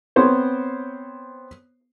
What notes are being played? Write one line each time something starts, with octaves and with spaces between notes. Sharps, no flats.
B3 C4 C5 C#5